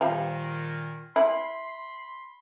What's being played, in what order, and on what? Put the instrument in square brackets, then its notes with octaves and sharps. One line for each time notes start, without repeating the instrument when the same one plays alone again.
[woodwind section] A#2 D#3 [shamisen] F3 G3
[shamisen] E4 [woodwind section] B5 C6